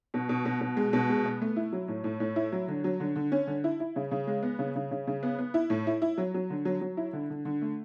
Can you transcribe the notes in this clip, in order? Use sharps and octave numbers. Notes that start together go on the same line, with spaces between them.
B2
B2
B2
B2
G#3
B2
G#3
B3
A3
E4
F#3
A2
A2
A2
E4
F#3
D3
F#3
D3
D3
C#4
D3
E4
E4
C#3
C#3
G#3
B3
C#3
C#3
C#3
C#3
B3
B3
E4
A2
E4
E4
F#3
F#3
D3
F#3
F#3
E4
D3
D3
D3
A3